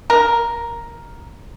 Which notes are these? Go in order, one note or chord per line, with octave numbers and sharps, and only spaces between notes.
A#4